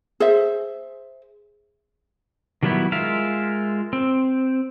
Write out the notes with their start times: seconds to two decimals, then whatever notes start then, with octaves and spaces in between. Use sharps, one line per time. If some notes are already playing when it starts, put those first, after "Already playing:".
0.20 G#4 C5 E5
2.63 D#3 F#3 G3 B3 E4
2.92 G#3 F4 A#4 E5 F5
3.93 C4